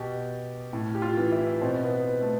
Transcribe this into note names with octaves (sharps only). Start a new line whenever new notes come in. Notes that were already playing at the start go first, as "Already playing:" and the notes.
Already playing: B2 G4
A2
G4
F4
E3
E4
B2 C4
B3
A3